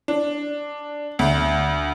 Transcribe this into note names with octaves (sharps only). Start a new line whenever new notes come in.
D4
D2